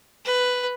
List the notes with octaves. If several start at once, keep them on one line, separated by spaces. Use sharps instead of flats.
B4